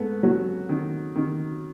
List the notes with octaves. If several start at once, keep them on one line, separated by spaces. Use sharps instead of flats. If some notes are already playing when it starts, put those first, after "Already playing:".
Already playing: G#2 A3 B3
F#3
D#3
D#3